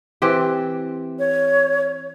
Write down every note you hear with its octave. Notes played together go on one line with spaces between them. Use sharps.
E3 C4 G4
C#5